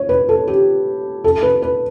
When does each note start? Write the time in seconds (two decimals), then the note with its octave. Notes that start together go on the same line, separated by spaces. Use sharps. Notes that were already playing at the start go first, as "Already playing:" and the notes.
Already playing: C#5
0.09 B4
0.29 A4
0.47 G4
1.24 A4
1.43 B4
1.62 B4